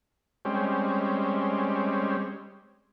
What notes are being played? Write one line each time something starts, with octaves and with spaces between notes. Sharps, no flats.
G3 G#3 C4 C#4